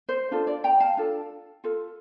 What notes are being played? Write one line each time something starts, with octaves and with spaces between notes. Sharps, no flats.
C5
D4 F4 A4 C5
D5
G5 A#5
F5 A5
D4 F4 A4
F4 A4